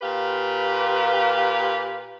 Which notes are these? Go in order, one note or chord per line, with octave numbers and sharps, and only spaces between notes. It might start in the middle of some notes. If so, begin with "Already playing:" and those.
A#2 G4 B4 F5